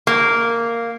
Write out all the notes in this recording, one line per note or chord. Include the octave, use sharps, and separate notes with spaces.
A#3